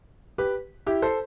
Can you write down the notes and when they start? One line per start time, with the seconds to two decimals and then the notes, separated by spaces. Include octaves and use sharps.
0.38 G4 B4
0.87 E4 G4
1.02 A4 C5